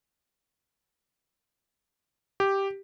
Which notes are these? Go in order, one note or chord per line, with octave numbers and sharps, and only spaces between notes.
G4